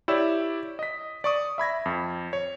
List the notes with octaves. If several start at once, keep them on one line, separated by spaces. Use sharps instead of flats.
E4 G4 C#5 D5 E6 E7
D#5 B6
D5 C#6 D#6
E5 B5 G#6 A#6
F2
C#5